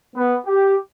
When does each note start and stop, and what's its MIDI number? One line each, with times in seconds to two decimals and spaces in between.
0.16 0.35 59
0.46 0.75 67